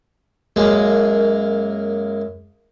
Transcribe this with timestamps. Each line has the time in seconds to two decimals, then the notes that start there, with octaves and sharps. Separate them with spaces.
0.56 F#2 G#3 A#3